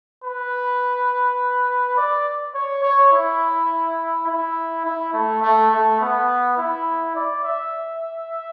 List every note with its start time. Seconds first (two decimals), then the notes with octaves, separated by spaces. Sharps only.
0.24 B4
1.97 D5
2.55 C#5
2.83 C#5
3.12 E4
4.27 E4
4.85 E4
5.13 A3
5.42 A3
5.71 A3
6.00 B3
6.58 E4
7.16 D5
7.44 E5